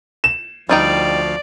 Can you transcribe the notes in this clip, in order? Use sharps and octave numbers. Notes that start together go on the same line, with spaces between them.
E7
D2 F3 G3 D#4 D5 F5 G5